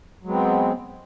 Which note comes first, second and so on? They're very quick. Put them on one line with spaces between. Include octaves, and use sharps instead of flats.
F#3 G#3 B3 C4